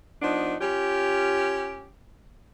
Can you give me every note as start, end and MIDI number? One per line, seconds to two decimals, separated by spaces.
0.22 0.55 53
0.22 0.55 59
0.22 0.55 62
0.22 0.55 63
0.61 1.89 61
0.61 1.89 65
0.61 1.89 67